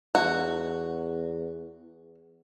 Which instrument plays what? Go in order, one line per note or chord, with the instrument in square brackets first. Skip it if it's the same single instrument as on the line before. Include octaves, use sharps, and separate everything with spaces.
[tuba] E2 [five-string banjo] F#4